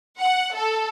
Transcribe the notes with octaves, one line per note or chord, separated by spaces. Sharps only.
F#5
A4